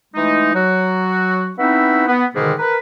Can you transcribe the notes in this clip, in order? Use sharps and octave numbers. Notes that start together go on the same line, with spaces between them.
E3 G#3 A3 D#4
F#3 F#4
B3 C4 D#4 E4 F#4 E5
B3
G#2 B2 D3 D#3 G3 G#3
A#4 B4